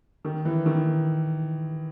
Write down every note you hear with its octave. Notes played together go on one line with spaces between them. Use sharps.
D#3
E3
D#3